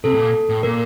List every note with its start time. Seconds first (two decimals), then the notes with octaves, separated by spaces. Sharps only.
0.04 C3 A4
0.14 A2
0.19 A#2
0.49 A2
0.63 A#2 A#4